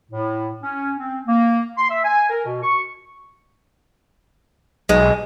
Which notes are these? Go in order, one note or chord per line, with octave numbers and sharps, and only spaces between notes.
A2
C#4
C4
A#3
C6
E5
G#5
A#4
B2
C#6
B1 G#3